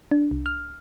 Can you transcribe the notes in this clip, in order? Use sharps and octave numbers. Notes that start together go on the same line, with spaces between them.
D4
C2
F6